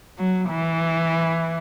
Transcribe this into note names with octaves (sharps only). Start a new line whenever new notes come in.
F#3
E3